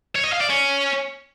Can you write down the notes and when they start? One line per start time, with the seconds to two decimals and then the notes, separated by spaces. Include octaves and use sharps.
0.16 C#5
0.24 D#5
0.33 F5
0.41 D5
0.50 C#4